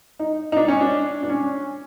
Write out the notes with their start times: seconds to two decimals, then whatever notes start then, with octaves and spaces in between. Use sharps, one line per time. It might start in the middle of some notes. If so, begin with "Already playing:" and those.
0.19 D#4
0.52 D#4
0.57 D4
0.68 C#4
0.80 D4
1.23 D4
1.30 C#4